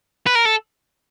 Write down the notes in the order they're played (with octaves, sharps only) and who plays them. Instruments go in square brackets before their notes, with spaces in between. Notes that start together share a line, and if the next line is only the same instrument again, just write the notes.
[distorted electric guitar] B4
A#4
A4